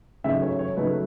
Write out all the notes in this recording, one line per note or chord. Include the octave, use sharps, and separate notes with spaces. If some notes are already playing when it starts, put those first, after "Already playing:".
C#3 F#3 A3 D#4 E5
C#5
C#5
C#3 F#3 A3 D#4 B4